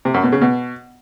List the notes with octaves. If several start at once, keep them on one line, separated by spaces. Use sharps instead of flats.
C3
F#2
B2
C#3
B2